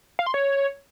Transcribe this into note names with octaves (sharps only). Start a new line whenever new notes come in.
F5
C6
C#5